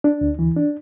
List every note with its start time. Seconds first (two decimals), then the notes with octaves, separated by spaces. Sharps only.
0.04 D4
0.21 D2
0.39 E3
0.56 D4